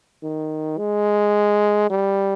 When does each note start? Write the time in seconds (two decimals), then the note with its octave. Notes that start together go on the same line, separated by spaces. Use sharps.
0.23 D#3
0.78 G#3
1.90 G3